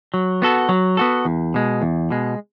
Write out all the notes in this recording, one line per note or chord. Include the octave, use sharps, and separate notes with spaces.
F#3
B3 F#4 A4
F#3
B3 F#4 A4
E2
B2 G#3
E2
B2 G#3